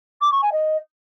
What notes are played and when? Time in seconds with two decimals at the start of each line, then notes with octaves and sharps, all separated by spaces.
0.21 D6
0.31 C#6
0.42 G#5
0.52 D#5